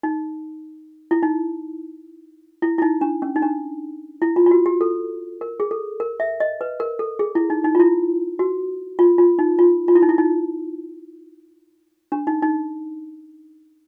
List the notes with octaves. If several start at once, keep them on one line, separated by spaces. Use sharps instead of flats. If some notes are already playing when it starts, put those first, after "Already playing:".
D#4
E4
D#4
E4
E4
D#4
D4
C#4
D#4
D4
E4
F4
F4
F#4
G4
A4
A#4
G#4
A4
A#4
E5
D#5
B4
A#4
A4
G#4
E4
D#4
D#4
F4
E4
F#4
F4
F4
D#4
F4
F4
E4
D#4
E4
D#4
D4
D#4
D#4